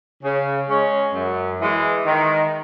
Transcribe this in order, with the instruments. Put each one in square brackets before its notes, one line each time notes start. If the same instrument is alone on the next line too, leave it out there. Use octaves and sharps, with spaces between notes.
[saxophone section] C#3
G#3 C#4
F#2
E3 G#3
D#3